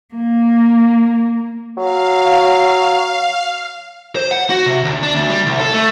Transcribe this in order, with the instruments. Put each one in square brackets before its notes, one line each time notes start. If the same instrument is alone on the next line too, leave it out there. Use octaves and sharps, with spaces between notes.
[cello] A#3
[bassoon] F#3 [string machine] F5
[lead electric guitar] C5
F#5
F#4
C3
D2
D4
D2
G3
C2
A4
A3